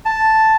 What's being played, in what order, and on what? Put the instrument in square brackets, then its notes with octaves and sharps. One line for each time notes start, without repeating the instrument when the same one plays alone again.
[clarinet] A5